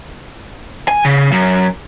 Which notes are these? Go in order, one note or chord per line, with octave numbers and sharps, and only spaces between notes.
G#5
C#3
F#2